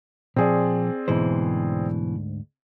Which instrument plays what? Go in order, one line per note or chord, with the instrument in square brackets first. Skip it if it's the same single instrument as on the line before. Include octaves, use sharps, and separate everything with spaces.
[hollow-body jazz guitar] A#2 F3 [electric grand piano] C4 G#4 D5
[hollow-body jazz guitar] D2 G#2 C5 [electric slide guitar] B2 E3